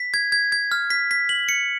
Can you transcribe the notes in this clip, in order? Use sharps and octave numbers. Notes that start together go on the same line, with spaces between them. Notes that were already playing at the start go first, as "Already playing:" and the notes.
Already playing: B6
G#6
G#6
G#6
F6
B6
B6
F#7
C#7